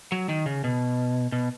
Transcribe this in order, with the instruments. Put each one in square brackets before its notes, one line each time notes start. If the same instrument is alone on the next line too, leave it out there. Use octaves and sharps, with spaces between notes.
[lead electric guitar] F#3
D#3
C#3
B2
B2